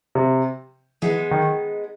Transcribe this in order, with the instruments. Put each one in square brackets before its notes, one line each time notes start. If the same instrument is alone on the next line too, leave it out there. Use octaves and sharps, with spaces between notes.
[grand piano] C3
[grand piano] E3 [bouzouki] G#3 B3 D#4
[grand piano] D#3